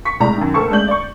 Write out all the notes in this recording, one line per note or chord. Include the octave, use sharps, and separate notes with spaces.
C#6 B6
C2 A2 G#3 D5 A#5
F#2 D#3
D2 A#3 A4 A5 C#6
G#3 A3 C#4 D5 G6 F#7
D5 C#6